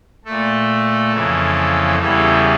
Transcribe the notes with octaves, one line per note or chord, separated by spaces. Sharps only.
A#2 A3 A4
F2 C#3 E3 A#3
E2 C#3 E3 G3 A4